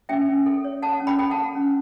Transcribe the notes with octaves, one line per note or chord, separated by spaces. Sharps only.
C#4 E5 G5
C#4
A4
C#5
A4 F#5 A5
C#4
G5 B5
A4 G5
F#5 A5
A4
C#4